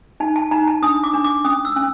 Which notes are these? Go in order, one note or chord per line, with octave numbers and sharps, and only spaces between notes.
D#4 A5
A5
D#4 A#5
A5
D4 D#6
D6
D4
D6
C#4 D#6
E6
C#4